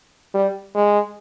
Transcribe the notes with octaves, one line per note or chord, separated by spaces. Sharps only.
G3
G#3